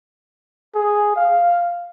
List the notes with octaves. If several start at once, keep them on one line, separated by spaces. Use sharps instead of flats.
G#4
F5